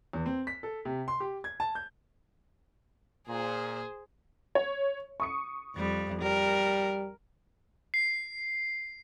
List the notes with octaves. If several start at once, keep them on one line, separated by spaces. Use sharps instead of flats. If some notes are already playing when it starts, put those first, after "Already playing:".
E2
C4
B6
A4
C3
C6
G4
G#6
A5
G6
A#2 G#4 C5
C#5
C#6 D#6 C#7
F2 G3
G3 A#4
C7